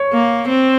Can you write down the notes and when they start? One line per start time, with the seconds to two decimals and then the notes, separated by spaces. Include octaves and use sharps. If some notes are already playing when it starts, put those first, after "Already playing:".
Already playing: C#5
0.13 A#3
0.49 C4